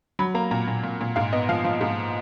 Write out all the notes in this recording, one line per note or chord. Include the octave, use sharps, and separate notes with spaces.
F#3 B5
A#3 A#5
A#2 A#5
A#2
A#2
A#2
G#2 F5
B3 D#5
F3 F5
F3
G#2